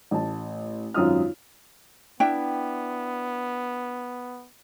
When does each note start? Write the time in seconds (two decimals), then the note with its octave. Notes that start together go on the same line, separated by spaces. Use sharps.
0.11 A1 A5
0.94 G#1 F#2 F4 D#6 F6
2.20 B3 D4 E4 G5